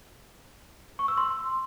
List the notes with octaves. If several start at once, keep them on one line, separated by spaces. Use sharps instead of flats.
C#6
E6
C6